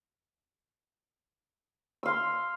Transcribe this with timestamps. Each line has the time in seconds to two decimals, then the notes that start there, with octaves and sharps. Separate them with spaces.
2.03 E6
2.06 F5
2.08 C6